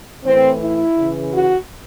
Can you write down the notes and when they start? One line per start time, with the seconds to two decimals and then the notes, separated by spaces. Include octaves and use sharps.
0.24 A2 E3 C4
0.60 E4
0.96 C#3 E3
1.33 F#4